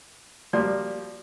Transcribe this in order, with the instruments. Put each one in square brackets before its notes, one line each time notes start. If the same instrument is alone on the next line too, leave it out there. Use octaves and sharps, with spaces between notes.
[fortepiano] F3 G3 A#3 [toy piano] F#4 D5